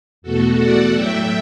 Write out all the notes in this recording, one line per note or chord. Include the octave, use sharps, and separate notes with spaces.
E2 B2 A3 F#4 A4
D5 F#5
A2 F#3 A3 E5 G5